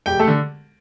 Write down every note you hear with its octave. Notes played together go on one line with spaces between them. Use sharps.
E1 G4 G5
A3 A4
D3